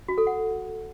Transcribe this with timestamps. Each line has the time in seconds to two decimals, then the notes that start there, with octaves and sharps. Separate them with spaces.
0.09 F#4
0.18 A4
0.27 F#5